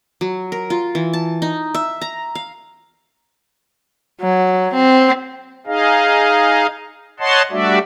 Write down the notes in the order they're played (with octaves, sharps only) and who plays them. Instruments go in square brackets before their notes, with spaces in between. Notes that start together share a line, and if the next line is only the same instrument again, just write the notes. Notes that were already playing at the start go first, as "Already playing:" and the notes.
[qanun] F#3
A#4
F4
E3
A5
D#4
E5
A#5
F5
[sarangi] F#3
C4
[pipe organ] D#4 G#4 D#5 F5
C#5 D#5 F#5 A5 C6
G3 A3 D4 F#4 D5 E5